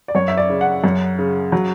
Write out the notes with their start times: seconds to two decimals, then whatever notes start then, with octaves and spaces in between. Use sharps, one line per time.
0.08 D5
0.15 F#2 C#5
0.28 E5
0.37 D5
0.49 C#3
0.61 F#5
0.84 F#2
1.18 C#3
1.52 F#3